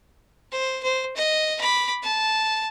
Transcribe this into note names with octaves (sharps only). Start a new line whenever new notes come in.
C5
C5
D#5
B5 D6
A5